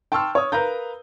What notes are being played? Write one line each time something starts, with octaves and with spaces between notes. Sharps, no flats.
G5 A5 C6 C#6 E6 F6
C#5 D#6
A#4 B4 F5 A#5 G6